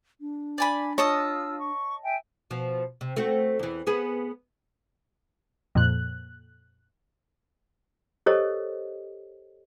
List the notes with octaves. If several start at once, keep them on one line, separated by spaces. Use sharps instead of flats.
D4
D5 G#5 B5
F4 C#5 D#5 A5 D#6 E6
C#6
E5 G5 G#5
B2 F3
C3
A3 C4 F#4
E2 E3
B3 G#4 B4
F2 A#2 F#6
G4 A4 A#4 C5 C#5 D#5